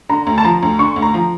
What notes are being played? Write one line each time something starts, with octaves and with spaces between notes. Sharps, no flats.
D3 A#5
D2
A5
F3 A#5
D2
D3 C#6
D2
A#5
F3